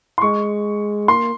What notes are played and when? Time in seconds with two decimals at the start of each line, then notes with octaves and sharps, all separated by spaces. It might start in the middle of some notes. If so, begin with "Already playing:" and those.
0.18 C6
0.21 G#3 C#6
1.08 A#3 C6